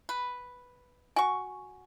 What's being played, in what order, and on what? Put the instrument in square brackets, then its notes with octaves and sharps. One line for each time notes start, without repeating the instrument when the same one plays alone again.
[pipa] B4
[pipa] F#4 C#6 [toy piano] G#5